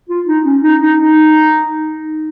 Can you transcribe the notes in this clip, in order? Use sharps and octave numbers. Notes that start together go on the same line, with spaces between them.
F4
D#4
C#4
D#4
D#4
D#4